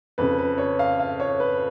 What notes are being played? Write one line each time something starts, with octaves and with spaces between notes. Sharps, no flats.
F2 C#3 B4
B4
C#5
F5
F5
C#5
B4